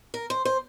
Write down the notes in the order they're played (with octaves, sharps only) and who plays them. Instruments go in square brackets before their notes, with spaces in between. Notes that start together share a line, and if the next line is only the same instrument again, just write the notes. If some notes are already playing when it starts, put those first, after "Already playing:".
[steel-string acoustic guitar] A#4
C5
C5